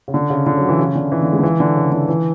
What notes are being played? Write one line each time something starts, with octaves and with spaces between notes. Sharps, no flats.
C#3
D3
C#3
D3
F#3
E3
C#3
D3
E3
D3
G#3
D3
E3
D3
C#3
D3
E3